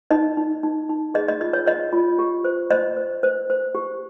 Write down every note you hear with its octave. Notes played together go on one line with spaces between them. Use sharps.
D#4 D#5
D#4
D#4
D#4
G#4 D#5
D#5
F4 D#5
C#5
C#5 D#5
F4
G4
C5
C5 D#5
C5
C5
C5
G4